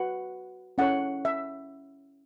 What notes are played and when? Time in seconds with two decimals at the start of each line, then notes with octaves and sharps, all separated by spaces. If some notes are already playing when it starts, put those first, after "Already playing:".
Already playing: F#4 B4 F#5
0.78 C#4 E4 A4 C#5 F#5
1.25 E5